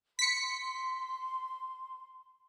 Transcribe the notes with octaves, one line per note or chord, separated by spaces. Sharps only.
C6 B6 C#7